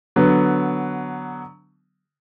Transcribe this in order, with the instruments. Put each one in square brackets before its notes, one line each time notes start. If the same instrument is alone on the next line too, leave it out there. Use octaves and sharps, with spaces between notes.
[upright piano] D3 F#3 B3